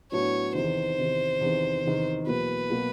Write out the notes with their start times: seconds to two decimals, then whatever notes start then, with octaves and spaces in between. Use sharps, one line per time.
0.12 A2 F#3 B3 D4 F#4 C#5
0.55 E2 C3 D#3 C5
0.98 E2 C3 D#3
1.41 E2 C3 D#3
1.85 E2 C3 D#3
2.27 E2 B2 F#3 A#3 B4
2.70 B2 F#3 A#3